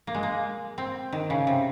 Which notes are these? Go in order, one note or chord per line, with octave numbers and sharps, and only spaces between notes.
A#3
G#3
A#3
C4
D#3
C#3
C3